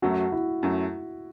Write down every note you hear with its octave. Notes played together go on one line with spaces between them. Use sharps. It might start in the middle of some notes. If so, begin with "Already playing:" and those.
F#2 F#3 A3 F#4
E4
F#2 F#3 A3